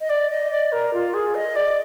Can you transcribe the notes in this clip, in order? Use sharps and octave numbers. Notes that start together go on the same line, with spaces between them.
D#5
D5
D#5
D5
A#4
F4
G#4
D#5
D5